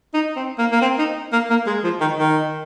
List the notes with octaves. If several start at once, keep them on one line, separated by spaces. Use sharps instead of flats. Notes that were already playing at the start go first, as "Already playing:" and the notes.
D#4
C4
A#3
A#3
C4
D#4
A#3
A#3
G#3
F3
D#3
D#3